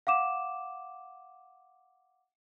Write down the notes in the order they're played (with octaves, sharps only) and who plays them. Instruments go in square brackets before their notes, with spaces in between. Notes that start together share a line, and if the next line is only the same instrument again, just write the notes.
[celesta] F5 F#5 D6 E7